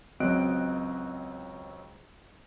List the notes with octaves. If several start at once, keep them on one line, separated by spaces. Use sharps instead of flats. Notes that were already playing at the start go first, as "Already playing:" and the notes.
C#2 F#3 C4 D#5 F#6 D7